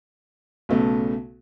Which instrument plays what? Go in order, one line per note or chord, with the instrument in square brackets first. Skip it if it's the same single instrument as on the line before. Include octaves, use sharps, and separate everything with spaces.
[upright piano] B1 C#3 A3 B3